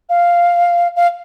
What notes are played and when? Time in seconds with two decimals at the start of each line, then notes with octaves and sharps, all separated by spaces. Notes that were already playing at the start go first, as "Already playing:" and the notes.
0.09 F5
0.96 F5